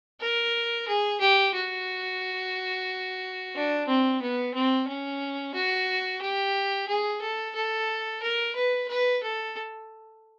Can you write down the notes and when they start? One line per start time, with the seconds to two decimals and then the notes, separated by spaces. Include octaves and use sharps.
0.21 A#4
0.87 G#4
1.20 G4
1.54 F#4
3.55 D4
3.87 C4
4.22 B3
4.54 C4
4.87 C#4
5.54 F#4
6.21 G4
6.88 G#4
7.22 A4
7.55 A4
8.23 A#4
8.55 B4
8.88 B4
9.23 A4